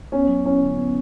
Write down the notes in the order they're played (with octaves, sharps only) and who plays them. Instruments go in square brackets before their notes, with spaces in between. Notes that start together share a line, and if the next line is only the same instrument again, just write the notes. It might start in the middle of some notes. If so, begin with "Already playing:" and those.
[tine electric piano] B3 [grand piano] C#4
[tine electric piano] F#3
[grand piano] C#4 [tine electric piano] E4
[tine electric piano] D3
B3